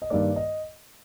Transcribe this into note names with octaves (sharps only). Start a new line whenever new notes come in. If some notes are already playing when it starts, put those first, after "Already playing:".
D#5
G2 D#3 A#3 D5
D#5